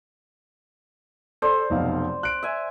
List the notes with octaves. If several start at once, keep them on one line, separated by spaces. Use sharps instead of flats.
A4 C5 D5
F1 B1 F5
F#6 D7
E5 G#5